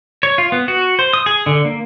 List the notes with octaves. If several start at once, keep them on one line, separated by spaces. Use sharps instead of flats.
C#5
F4
B3
F#4
C5
D#6
G#4
D3
A#3